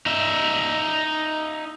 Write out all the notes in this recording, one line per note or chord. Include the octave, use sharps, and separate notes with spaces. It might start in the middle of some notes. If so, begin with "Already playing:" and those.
D#4 E5